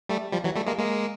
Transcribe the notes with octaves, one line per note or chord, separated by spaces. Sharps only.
G3 A3
F3 G3
E3 F#3
G3 A3
G#3 A#3
G#3 A#3